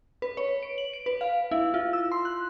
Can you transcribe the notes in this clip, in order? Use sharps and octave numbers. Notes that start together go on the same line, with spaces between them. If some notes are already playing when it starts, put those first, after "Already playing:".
B4
C#5
D7
F#7
D7
B4
F5
E4
F4
E6
C6
F#6